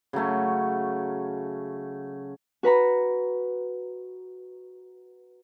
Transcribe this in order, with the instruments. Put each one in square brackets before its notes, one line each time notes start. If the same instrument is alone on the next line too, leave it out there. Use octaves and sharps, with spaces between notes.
[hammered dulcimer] C#3 F#3 A3 C#4
[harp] F#4 B4 A#5 B5